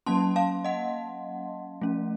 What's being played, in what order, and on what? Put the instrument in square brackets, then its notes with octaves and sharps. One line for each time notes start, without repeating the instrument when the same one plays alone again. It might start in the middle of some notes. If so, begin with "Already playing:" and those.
[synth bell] F#3 A#3 C#4 A5 C6
F5 A5
D#5 F#5
F3 A3 C#4